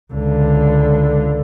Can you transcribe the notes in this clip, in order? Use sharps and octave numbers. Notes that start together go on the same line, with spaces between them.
C#2 D3